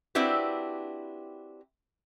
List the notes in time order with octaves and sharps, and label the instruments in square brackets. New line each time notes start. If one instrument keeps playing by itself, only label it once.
[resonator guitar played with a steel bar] C4 D4 E4 F#4 G4 B4